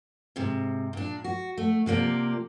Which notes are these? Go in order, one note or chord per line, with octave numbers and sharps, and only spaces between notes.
G#2 C3
A#2 D4
F#4
A3
C3 F3 A#3 D5